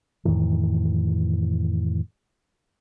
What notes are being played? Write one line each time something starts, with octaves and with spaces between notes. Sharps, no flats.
F2 A2 D#3 E3